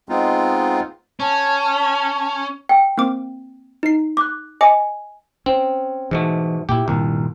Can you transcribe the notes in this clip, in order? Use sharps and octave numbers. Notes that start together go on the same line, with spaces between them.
G#3 B3 C4 D#4 F4
C#4 A5
G5
A#3 C4 D6
D#4 C7
D6 F#6
D#5 G#5 D6 C#7
C4 C#4
G#2 B2 E3 A3
A#2 E4 G4
C2 G2 A#2 D#3